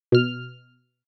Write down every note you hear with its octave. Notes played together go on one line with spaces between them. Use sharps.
B2 F6